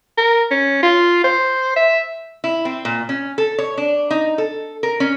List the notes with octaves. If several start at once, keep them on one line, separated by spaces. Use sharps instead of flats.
A#4
C#4
F4
C5
E5
E4
C4
A#2
C#4
A4
C#5
D4
D#4
A4
A#4
C#4